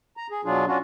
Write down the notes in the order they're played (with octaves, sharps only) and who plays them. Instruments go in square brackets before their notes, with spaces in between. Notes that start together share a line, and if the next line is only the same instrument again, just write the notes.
[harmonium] A#5
G#4
B2 F#3 D4 F4 G#4
C#4 D4 F4 F#4